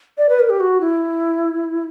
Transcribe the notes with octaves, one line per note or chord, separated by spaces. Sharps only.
D5
B4
A#4
G4
F#4
E4